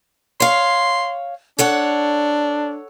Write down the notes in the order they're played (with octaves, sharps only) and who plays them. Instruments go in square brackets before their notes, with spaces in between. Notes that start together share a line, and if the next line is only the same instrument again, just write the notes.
[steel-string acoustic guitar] C#5 F5 [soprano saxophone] C6
[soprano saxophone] D4 [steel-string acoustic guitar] A4 C#5 F#5